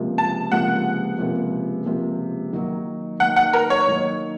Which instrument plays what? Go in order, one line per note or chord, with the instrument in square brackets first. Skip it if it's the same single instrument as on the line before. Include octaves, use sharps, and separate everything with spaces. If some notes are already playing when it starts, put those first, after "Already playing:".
Already playing: [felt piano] C#2 C3 F3 A#3
[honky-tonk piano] A5
[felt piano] C#2 C3 F3 A#3 [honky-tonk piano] F#5
[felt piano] C#2 C3 F3 A#3
C#2 C3 F3 A#3
D#3 F#3 A#3 D#4
[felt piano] D#3 F#3 A#3 D#4 [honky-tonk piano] F#5
[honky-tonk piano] F#5
A#4
C#5
[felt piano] D#3 F#3 A#3 D#4